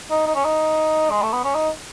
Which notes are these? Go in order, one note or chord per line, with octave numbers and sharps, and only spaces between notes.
D#4
D#4
C#4
D#4
G#3
A3
B3
C#4
D#4